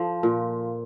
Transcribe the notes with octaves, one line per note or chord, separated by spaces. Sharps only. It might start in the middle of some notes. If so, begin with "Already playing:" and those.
Already playing: F3 A4
A#2